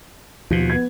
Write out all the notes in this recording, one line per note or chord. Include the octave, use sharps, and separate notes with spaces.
D#2 B2 F3
B3 G#6